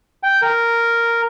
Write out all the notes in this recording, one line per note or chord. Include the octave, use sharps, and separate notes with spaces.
G5
A#4